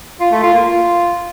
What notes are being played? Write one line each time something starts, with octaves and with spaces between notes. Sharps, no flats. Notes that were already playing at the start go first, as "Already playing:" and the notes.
F4
A3
F4
A#3
F4